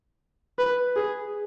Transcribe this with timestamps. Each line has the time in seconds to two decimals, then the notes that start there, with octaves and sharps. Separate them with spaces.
0.59 B4
0.96 G#4